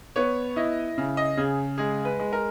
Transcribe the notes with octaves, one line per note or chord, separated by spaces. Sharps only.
B3 C#5
E4 D#5
C#3
D#5
C#3 G#4
G#3 G#4
B4
G#3
A#4